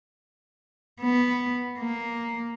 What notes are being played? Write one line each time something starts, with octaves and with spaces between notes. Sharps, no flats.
B3
A#3